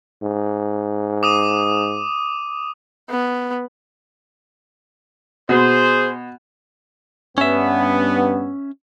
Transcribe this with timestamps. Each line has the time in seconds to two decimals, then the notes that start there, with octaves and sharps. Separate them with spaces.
0.22 G#2
1.23 D6 D#6 D#7
3.10 B3
5.49 B2 G#4 C5
7.38 G2 B3 C#4 E5